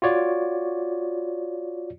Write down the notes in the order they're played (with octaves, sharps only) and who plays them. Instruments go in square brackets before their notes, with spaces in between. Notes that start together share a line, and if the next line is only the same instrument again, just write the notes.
[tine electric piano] F4 F#4 C#5 D5